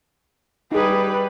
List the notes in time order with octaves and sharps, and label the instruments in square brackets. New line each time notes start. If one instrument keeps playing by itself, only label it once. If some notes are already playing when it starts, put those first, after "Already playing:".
[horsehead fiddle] G3 B4 [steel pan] D#4 G#4